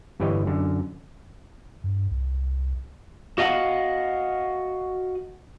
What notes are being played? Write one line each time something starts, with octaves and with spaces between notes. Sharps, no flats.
G1 E3 G3 G4 C#5 D#5
F#2 D3
G2
C2
F#4 D#5 F5 F#5